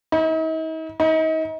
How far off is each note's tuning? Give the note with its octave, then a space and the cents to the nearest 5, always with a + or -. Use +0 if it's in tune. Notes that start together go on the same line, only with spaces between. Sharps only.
D#4 +45
D#4 +35